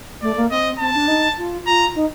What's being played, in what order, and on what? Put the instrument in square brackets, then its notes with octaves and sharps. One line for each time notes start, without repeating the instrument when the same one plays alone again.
[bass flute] A3 [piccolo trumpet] D5
[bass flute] A#3
[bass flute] C4 [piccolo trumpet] D#5
[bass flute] C4 [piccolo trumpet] A5
[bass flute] D4
D#4
F4
[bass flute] F4 [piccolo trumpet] A#5
[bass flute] D#4